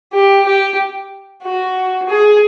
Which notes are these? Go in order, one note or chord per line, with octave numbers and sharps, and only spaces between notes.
G4
G4
F#4
G#4